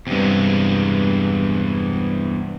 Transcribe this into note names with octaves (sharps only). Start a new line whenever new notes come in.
E2 G2 C3 G#3